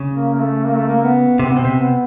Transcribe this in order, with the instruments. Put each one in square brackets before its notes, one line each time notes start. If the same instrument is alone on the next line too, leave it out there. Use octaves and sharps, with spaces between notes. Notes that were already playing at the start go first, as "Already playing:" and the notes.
Already playing: [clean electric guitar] C#3
[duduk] A#3
A#3
A3
A#3
A3
A#3
B3
[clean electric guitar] C3 [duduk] C4
[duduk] B3
[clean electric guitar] B2 [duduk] C4
[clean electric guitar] C3
[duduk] B3